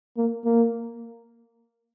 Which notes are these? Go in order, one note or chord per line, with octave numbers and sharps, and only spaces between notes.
A#3
A#3